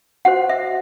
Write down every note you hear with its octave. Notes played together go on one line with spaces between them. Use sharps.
F#4 C5 F#5
E5